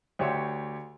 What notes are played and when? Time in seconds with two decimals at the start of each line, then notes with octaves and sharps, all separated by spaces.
0.19 D2 G4 C#5 E5 C6